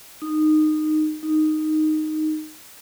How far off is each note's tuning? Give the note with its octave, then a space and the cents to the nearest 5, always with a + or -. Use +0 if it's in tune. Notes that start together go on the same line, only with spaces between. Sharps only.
D#4 -15
D#4 -5